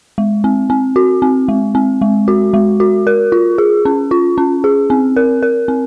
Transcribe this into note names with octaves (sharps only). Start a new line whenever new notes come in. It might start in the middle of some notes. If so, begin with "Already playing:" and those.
G#3
C4
C4
F#4
C4
G#3
C4
G#3
F#4
G#3
F#4
A#4
F4
G#4
C#4
F4
C#4
G#4
C4
A#4
A#4
C4